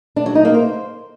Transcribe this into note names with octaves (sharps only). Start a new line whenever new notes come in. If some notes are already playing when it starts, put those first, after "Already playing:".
D4
F#3
D#4
A#3
C5